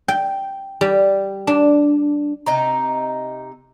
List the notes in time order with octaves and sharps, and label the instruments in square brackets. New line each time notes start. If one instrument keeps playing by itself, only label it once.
[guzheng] G5
G3
D4
[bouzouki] C3 D#4 A#5